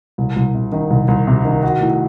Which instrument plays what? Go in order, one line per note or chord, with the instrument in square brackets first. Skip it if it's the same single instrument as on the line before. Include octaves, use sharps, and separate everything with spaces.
[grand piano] C2
C2
C3
D#3
C2
C2
C3
D#3
F#4
A2